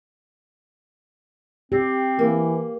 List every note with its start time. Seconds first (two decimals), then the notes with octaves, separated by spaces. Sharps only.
1.72 C4 G4
2.19 E3 A#3